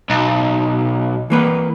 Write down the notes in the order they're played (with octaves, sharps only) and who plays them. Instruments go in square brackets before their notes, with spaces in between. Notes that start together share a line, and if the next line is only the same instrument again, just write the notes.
[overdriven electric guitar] B1
[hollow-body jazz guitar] E3 A#3 B4